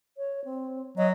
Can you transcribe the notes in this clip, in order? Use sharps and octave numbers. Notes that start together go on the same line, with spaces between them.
C#5
C4
F#3 D#5